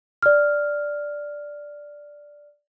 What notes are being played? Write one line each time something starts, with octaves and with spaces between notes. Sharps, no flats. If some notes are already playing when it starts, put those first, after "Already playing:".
D5 F6